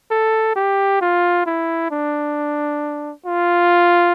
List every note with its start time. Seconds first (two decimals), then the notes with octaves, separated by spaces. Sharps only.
0.11 A4
0.56 G4
1.01 F4
1.46 E4
1.91 D4
3.26 F4